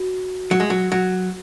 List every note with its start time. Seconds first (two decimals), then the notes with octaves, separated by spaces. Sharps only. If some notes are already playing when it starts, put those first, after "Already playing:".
Already playing: F#4
0.51 F#3
0.60 G#3
0.70 F#3
0.92 F#3